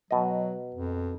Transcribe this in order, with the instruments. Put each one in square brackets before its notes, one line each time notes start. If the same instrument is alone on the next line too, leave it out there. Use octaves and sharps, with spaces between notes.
[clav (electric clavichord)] B2 D#5 [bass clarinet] F#3
[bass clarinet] F2